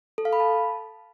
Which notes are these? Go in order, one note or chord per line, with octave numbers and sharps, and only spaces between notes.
A4
F5
B5
A5